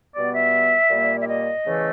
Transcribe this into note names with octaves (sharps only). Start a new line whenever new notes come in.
B2 G3 B3 D5
E5
A#2 G3 A#3
E5
D#5
E2 C#3 E3 A3